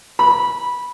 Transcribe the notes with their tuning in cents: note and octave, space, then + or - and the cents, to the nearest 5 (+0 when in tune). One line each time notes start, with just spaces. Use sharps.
B5 -15